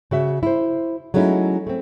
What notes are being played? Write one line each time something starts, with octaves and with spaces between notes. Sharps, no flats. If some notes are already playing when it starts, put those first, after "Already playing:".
C#3 F#4 E5
E4 C5
F#3 G#3 A3 C#4 D#4 E4
A3 C4